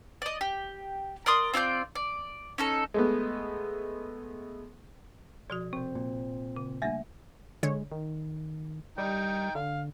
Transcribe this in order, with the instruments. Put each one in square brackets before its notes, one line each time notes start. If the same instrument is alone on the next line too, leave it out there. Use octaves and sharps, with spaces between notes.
[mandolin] D5 D#5
G4
A#4 D5 C6 D#6
C4 F4 D5 G6
D5
C#4 D#4 A4
[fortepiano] G#3 A3 B3
[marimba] B2 F3 F#4 [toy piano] D5
[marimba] C3 [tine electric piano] C4 C5
[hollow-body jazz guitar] A#2
[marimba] C#3
[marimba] G3 A3 A#3 [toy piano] D4 E5 [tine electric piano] G#5
[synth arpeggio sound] D3 C#5 [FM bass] G#3
[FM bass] D#3
[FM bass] G3 [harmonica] D#4 G5
[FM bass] D3 [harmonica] F5